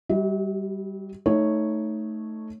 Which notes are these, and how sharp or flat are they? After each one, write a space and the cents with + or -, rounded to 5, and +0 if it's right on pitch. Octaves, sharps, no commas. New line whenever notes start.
G3 +0 F#4 +40 E5 -45
A3 +0 D#4 +10 C#5 -5